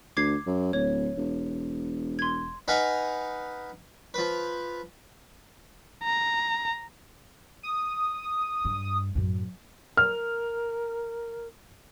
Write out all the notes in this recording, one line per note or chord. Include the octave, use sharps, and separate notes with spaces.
D2 D6 G#6 C7
F#2
D1 C#5
E1
C6 G#6
D#4 B4 F5 F#5 G#5
F3 B4
A#5
D#6
G2
F#2 A2
A#4 F6